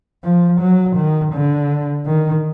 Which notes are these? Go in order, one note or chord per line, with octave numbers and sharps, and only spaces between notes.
F3
F#3
D#3
D3
D#3